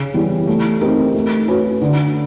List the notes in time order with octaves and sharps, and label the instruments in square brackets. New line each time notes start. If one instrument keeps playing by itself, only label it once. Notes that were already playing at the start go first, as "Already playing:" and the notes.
Already playing: [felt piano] C#3
E3 G3 B3
A3
C4 D#4 G4 A#4
A3
C#4 F#4 B4
D3